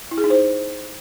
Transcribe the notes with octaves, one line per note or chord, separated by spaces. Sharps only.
E4
G#4
D#4
C5